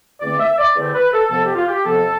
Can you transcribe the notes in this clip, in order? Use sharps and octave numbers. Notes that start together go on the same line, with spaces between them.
E2 D3 A3 C4 D5
E5
D5
E2 D3 A3 C4 D5
B4
A4
F2 C3 F3 B3 A4
G4
F4
G4
F2 C3 F3 B3 A4